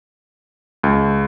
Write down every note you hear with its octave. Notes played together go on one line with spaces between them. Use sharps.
C#2